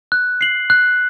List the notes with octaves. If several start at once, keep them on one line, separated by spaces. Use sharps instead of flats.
F#6
C7 F#7
F#6